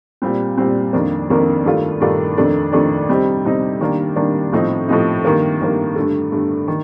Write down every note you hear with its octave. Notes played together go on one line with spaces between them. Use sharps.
A#2 G3 C4
A#2 G3 C4
F2 D#3 A#3 D4
F2 D#3 A#3 D4
G2 D#3 A3 D4 F4
G2 D#3 A3 D4 F4
F2 D#3 A3 D4
F2 D#3 A3 D4
C3 G3 C4 D#4
C3 G3 C4 D#4
D#3 G3 A#3 D4
D#3 G3 A#3 D4
A2 F3 C4 D#4
A2 F3 C4 D#4
G2 D#3 A#3
G2 D#3 A#3
G2 D3 A3
G2 D3 A3
D#3